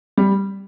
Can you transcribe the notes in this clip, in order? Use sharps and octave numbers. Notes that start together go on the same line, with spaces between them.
G3